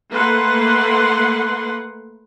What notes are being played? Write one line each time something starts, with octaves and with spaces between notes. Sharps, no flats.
A3 A#3 B4 F#5 C6